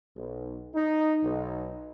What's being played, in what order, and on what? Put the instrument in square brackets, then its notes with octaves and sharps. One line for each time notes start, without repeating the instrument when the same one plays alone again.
[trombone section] B1
D#4
B1